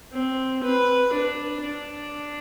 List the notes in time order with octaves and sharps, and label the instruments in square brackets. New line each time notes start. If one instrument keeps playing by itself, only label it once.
[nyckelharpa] C4
B4
D4
D4